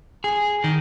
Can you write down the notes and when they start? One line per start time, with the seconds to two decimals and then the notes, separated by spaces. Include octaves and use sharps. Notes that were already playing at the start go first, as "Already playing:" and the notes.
0.24 G#4
0.64 D#3